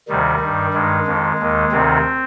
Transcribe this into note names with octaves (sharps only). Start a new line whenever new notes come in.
D2 C3 D#3 G3
G2 D#3
G2 D#3 G#3
F2 D#3
D#2 D#3
D2 C3 D#3 C4